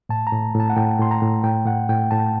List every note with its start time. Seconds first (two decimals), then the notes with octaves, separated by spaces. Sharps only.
0.09 A2 A5
0.27 A#5
0.32 A2
0.54 A2
0.60 A5
0.70 F#5
0.76 A2 G5
0.99 A2 C6
1.11 A#5
1.22 A2
1.43 A2 G5
1.66 A2 F#5
1.89 A2 G5
2.11 A2 A5